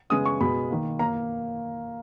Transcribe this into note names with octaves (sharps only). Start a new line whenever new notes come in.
C#3 G#3 B3 D#6
C#6
B2 G#3 B3 B5
D#3 A#3
A#3 A#5